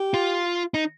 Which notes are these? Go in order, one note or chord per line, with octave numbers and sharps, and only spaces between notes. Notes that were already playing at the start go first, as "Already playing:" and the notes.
Already playing: G4
F4
D#4